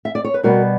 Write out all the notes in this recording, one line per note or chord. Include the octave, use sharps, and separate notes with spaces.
E5
D5
C#5
B4
B2 G3 B3 F#4 A#4